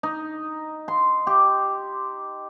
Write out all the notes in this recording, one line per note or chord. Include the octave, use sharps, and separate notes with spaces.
D#4
C6
G4